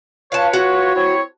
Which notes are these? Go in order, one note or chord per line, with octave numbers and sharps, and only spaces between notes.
F4 B4 C#5 F5 A5
F#4
C4 E4 C#5